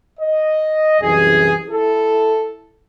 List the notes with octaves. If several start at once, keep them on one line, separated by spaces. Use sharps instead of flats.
D#5
C2 F#2 E3 G#4
E4 A4